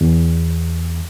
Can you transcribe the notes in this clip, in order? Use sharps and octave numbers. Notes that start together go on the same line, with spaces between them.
E2